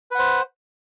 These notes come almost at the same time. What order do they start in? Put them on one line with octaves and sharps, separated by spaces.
B4 F#5 C5